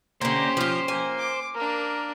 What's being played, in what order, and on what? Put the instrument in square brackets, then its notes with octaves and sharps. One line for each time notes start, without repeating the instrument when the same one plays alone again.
[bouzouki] D3 A#3 [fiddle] C#4 G4 [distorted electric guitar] C5
[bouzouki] F3 F4
[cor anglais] A#3 [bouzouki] G#5
[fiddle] D6
[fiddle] A#3 D4 [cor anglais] A#4